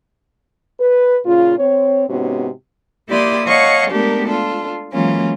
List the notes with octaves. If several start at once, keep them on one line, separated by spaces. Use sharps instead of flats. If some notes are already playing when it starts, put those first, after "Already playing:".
B4
A#2 C#3 F4
C4 C#5
G#2 C3 B3 C#4 F#4
A#3 E4 G4 D5 C6 D#6
C#5 D#5 F5 F#5 A5 C#6
G#3 A3 B3 D4 G4 A#4
D4 F4 A4
E3 F#3 G#3 A#3 C#4 F4